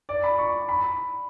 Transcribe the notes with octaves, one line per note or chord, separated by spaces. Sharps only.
D5
B5
C#6
B5